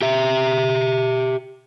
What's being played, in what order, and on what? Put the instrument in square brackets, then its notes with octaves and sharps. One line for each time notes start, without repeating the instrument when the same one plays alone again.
[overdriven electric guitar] G4 E5